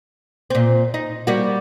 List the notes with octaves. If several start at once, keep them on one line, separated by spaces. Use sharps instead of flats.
A#2 C4
D#4
G3 A#3 F#4